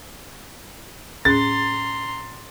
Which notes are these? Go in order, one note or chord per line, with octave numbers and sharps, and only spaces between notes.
A2 C#4 G#4 A#5 C6 A6